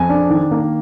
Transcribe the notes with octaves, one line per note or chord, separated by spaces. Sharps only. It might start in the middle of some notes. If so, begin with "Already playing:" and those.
Already playing: F2 G#5
D4
D#3
A#3